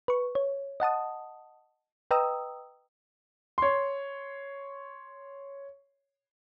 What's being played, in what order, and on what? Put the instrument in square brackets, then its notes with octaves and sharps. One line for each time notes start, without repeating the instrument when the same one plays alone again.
[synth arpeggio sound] B4 C#6
C#5
D#5 F#5 A5 D#6
B4 D#5 G5 A#5 D#6 E6
[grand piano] C#5 C6